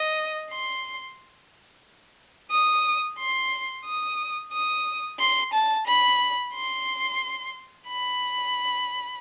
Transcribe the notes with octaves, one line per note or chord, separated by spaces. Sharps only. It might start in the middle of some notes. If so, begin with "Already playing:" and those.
Already playing: D#5
C6
D#6
C6
D#6
D#6
C6
A5
B5
C6
B5